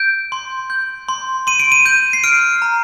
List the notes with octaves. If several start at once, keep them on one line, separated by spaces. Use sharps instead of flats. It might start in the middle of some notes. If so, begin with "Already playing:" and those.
Already playing: G6 D7
C6
G6
C6
C6 D#7
D7
D#7
G6 D#7
C7
F6 D7
A#5